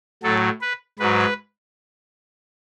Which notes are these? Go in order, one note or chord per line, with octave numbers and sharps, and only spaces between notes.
A2 F#3 A4
B4
G#2 F#3 B4